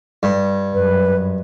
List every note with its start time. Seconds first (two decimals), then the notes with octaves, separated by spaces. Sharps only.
0.23 G2
0.74 F#2 B4